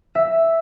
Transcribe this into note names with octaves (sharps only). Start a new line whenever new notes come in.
E5